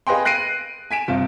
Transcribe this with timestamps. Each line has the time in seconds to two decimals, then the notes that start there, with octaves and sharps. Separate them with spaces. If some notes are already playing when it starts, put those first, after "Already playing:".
0.07 G#4 B4 D#5 F5 G5 C6
0.25 F#6 A#6 C7 D7 D#7
0.91 G#5 B6 D7 E7
1.08 G1 C3 F4